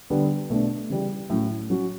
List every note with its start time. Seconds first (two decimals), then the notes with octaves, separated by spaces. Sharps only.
0.10 D3 G3 B3
0.50 B2 A3 D4
0.90 C#3 E3 G3
1.30 A2 F#3 C#4
1.70 F#3 C#4 F#4